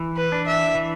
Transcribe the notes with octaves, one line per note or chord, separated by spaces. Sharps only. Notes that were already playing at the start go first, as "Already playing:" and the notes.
Already playing: E3
B4
D4
E5
E3